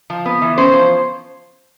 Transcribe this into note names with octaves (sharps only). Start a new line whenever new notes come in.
F3
B3
E3
C#4 C5
F3